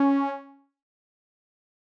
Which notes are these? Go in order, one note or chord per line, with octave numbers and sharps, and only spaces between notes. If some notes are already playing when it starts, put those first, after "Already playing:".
Already playing: C#4